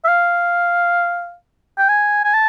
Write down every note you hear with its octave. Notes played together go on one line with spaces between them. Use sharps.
E5
F5
G5
G#5
G#5
A5